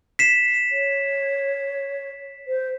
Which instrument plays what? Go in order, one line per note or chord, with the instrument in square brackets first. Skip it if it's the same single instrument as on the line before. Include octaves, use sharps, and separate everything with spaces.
[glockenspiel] B6 C7 E7
[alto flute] C#5
C5